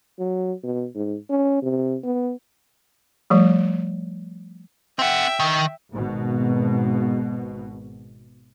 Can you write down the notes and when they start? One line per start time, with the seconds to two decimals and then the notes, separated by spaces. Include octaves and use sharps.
0.19 F#3
0.63 B2
0.95 G#2
1.29 C#4
1.62 C3
2.03 B3
3.30 F3 G3 A3
4.99 C4 E5 F#5 G5
5.40 D#3
5.94 G#1 B2